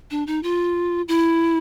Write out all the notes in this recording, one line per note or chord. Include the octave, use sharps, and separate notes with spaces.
D4
D#4
F4
E4